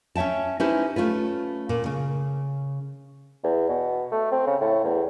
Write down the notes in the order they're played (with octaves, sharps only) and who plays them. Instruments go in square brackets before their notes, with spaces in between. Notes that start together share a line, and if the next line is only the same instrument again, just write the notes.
[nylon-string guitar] C#4 C#5 E5 G5 A5
C#4 D#4 E4 G4 B4 C5
A3 C#4 F4 B4
A#2
C#3
[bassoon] E2
B2
A3
C4
C#3
A2
E2